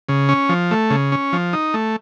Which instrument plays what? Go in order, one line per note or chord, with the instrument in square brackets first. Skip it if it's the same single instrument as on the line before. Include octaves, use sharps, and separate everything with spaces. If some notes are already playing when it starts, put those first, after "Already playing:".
[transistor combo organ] C#3
C#4
F3
A3
C#3
C#4
F3
D#4
A3